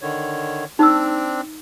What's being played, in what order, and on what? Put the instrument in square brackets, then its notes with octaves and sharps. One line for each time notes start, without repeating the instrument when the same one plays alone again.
[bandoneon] D3 D#3 C#5
[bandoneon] C4 D4 [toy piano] D#4 E6